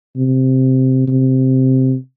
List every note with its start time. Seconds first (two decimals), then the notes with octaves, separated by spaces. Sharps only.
0.17 C3
1.08 C3